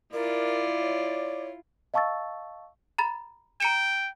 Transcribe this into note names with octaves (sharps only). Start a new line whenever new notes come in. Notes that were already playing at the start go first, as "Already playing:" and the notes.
E4 F4 A#4 D5
C#5
D#5 F5 A5 C#6 E6 A6
A#5 B5 A6
G5 A#5 C#7 E7